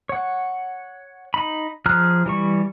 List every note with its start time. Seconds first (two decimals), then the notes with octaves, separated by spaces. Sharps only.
0.09 C#5 F#5
1.34 D#4 B5
1.86 F3 G#4 A#5 F6 F#6
2.26 E3 G3 C#6